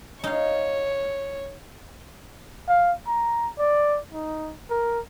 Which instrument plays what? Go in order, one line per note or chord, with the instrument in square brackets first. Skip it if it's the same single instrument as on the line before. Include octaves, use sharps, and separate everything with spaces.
[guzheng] D#4 F5 [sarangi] C#5
[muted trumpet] F5
A#5
D5
D#4
A#4